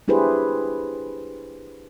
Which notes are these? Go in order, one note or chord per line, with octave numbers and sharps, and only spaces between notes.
D4 E4 G4 G#4 B4 C5